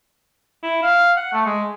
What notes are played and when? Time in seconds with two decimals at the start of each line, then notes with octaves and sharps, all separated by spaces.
0.63 E4
0.83 F5
1.17 F#5
1.33 A3
1.46 G#3